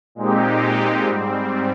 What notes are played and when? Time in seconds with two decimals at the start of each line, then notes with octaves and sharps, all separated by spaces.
0.15 A#2 G#3 C4 D#4 G4
1.07 G#2 G3 C4